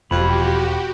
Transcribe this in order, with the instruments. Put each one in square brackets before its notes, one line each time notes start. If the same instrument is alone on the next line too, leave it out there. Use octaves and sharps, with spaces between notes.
[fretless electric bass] E1 [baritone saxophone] F2 [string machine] F#4 G4 [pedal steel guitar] B5